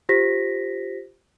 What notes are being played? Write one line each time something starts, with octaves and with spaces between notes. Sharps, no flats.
F4 G4 C5 A#6 B6